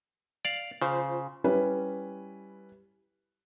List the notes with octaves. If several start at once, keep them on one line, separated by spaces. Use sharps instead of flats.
D5 F5
C#3 F4 C5
G3 C#4 E4 B4